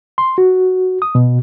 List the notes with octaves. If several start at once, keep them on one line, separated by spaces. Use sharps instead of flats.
C6
F#4
D#6
B2